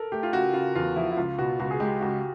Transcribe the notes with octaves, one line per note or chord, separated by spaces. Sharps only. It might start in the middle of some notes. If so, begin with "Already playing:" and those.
Already playing: A4 A#4
A3 G4
F4
C#3 F#4
C#3 F4
E2 F4
F3 E4
E4
C#2 F4
B2 F#4
C#2 F#4
G#4
G#3 G4
C#2 F#4